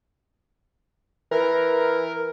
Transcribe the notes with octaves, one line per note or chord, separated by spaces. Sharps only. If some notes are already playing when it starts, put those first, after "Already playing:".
E3 A#4